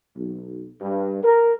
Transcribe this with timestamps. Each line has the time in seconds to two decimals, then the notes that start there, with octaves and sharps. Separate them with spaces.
0.16 B1
0.80 G2
1.23 A#4